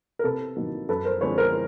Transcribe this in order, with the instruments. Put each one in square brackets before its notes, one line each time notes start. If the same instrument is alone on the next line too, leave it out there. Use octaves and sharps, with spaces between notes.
[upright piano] A#4
C3 A4 B4
D#3 F#3 A#3
F#2 A4 B4
A#4 C5
D3 F3 G#3 C4 B4 C#5
A#4 C5